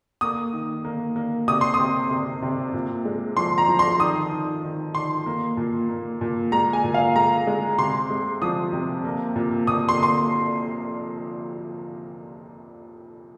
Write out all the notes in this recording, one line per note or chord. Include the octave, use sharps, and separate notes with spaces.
A#3 D#6
D#3
A#3
A#3
C3 D#6
C6
D#6
C3
C3
C3
A#2
G#3
F3 C6
A#5
F3
C6
D#3 D#6
D#3
D#3
D#3 C6
A#3
A#2
A#3
A#2
G#3 A#5
G#5
A#2
F5
G#3 A#5
G#3
C3 C6
G#3
F3 D#6
C3
A#3
A#2
A#2 D#6
C6
A#3 C6